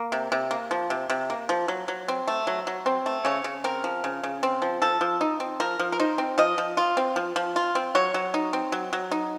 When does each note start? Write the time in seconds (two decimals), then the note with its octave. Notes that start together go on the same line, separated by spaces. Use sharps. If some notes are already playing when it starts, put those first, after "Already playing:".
Already playing: A#3
0.12 C3
0.32 C3
0.51 A#3
0.71 F3
0.90 C3
1.10 C3
1.30 A#3
1.49 F3
1.68 F#3
1.88 F#3
2.08 C4
2.28 A3
2.47 F#3
2.67 F#3
2.86 C4
3.06 A3
3.25 C#3 C#5
3.44 C#3
3.64 C4 A#4
3.84 F3
4.04 C#3
4.23 C#3
4.43 C4
4.62 F3
4.82 F3 A4
5.01 F3
5.21 D#4
5.40 C4
5.60 F3 A#4
5.79 F3
5.92 A#4
5.99 D#4 C5
6.18 C4
6.38 F3 D#5
6.58 F3
6.77 F4
6.97 C4
7.16 F3
7.36 F3
7.56 F4
7.75 C4
7.95 F#3 C#5
8.14 F#3
8.34 D#4
8.53 C4
8.72 F#3
8.93 F#3
9.11 D#4